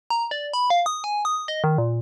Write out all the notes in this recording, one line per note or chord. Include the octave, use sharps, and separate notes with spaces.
A#5
D5
B5
F5
D#6
G#5
D#6
D#5
D#3
A#2